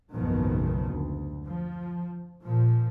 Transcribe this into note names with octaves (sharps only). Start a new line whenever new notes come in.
F#1 B1 G#2 D#3 F3 B3
D2
F3
A#2 F3